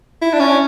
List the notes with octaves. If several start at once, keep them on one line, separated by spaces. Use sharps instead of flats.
E4
D4
C#4